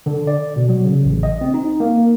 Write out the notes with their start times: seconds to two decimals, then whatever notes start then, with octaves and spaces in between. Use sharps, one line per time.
0.06 D3
0.27 D5
0.56 B2
0.69 F#3
0.85 C#3
1.04 A1
1.23 D#5
1.41 C4
1.54 D#4
1.80 A#3